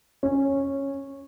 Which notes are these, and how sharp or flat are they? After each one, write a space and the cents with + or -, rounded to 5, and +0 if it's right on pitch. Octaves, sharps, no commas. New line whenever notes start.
C#4 -10